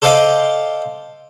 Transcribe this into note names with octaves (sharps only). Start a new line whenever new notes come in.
A4 C5 D5 D#5 F5 G5